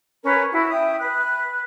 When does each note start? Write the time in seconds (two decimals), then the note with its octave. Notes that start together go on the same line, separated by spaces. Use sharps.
0.24 C#4 A#4 B4 C#5
0.52 E4 F#4
0.70 E5 G5 D#6
0.99 B4 F#6